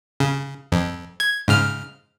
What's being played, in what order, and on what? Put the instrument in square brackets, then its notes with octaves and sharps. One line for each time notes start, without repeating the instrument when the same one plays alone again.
[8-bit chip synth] C#3
F2
G#6
G#2 C#3 F6